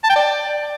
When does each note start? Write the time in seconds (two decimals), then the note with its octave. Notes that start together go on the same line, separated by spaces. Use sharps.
0.04 A5
0.10 G5
0.16 D5